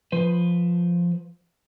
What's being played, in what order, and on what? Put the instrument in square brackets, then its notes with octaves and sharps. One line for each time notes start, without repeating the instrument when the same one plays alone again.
[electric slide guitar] F3 B4 C5